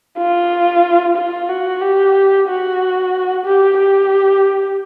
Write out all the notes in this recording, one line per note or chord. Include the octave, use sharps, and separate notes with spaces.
F4
F4
F#4
G4
F#4
G4
G4